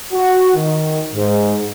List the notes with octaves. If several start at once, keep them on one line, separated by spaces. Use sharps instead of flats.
F#4
D#3
G#2